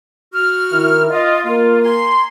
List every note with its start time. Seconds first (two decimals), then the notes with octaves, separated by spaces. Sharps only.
0.33 F#4 F6
0.72 D#3 E4 A#4
1.10 F4 D#5
1.45 A#3 F4
1.82 G#5 A#5 C6